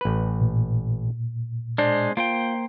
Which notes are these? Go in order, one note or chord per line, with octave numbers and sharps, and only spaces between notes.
A1 B4
A#2
G#3 D4 C5
A#3 F4 C5 G5